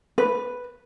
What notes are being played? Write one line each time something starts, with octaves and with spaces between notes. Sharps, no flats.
B4